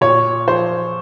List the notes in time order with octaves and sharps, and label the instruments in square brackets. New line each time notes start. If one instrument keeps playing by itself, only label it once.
[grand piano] A#2 C#5
F3 C5